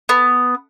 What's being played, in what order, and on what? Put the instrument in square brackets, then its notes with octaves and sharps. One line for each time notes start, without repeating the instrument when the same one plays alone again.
[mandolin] B3